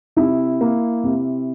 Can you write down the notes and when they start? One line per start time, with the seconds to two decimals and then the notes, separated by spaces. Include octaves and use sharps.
0.16 C3 E4
0.61 A#3
1.04 C3